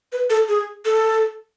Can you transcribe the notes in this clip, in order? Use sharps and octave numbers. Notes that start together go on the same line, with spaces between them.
B4
A4
G#4
A4